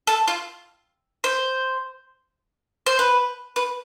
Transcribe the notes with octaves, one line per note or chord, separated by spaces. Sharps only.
A4
F4
C5
C5
B4
B4